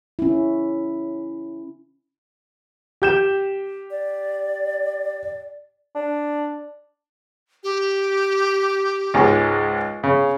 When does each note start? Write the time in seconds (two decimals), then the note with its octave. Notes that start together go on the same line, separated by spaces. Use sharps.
0.19 C#4 E4
3.02 G4 G6 E7
3.91 D5
5.95 D4
7.64 G4
9.14 C#2 G#2 G#3
10.04 C#3